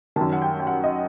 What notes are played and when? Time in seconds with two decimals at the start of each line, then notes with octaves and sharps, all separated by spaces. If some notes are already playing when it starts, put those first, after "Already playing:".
0.16 D#3 A5
0.20 F#2
0.33 F#5
0.42 G5
0.60 G5
0.67 F#5
0.84 D#5